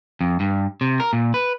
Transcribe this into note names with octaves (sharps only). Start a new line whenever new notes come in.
F2
G2
C3
A#4
A#2
B4